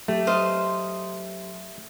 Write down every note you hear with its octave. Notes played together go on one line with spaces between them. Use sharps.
F#3 A3 G4
C5 D#5 F5